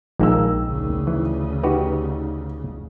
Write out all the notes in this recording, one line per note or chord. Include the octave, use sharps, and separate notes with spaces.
A#1 D#3 G#3 A#3 E6
D2 C#3
E3
D#4 F#4 G4 B4